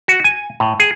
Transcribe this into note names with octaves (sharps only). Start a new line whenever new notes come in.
F#4
G#5
A2
G#4